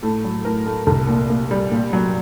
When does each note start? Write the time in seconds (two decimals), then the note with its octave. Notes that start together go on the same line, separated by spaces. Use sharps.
0.03 A2 A4
0.24 F#3
0.45 A2 A#4
0.66 A3
0.87 C2
1.09 A#2
1.30 A#3
1.51 G3
1.71 A#2
1.93 F#3